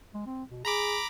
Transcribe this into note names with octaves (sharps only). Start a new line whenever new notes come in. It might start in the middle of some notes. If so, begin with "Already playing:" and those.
G#3
C4
B2
G#4 A#5 B5 D6